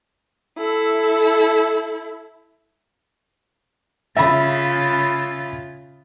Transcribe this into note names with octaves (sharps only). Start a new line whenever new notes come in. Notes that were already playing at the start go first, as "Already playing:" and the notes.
E4 A4
C#3 F4 E5 B5